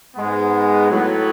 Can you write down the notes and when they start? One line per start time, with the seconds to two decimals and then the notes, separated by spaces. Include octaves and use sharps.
0.15 G#2 G#3 B3
0.90 A2 F#3 B3